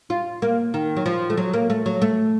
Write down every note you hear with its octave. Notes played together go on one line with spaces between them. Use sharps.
F4
A#3
D#3
F#3
F3
A3
F#3
A#3
A3
F#3
A3